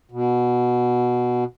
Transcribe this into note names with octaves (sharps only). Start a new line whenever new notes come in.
B2